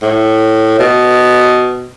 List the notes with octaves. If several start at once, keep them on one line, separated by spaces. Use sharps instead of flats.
A2
B2